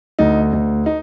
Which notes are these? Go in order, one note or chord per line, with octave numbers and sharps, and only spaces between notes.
D2 D#4
D2
D#4